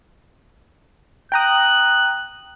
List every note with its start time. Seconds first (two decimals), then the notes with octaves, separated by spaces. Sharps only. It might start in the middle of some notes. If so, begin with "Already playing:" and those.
1.32 G5 A#5 D#6 F#6